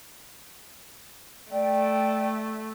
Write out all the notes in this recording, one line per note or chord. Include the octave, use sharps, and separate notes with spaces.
A3 D5 G5